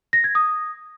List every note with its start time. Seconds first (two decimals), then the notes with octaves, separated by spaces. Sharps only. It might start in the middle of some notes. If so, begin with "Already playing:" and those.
0.13 A#6
0.24 G#6
0.35 D#6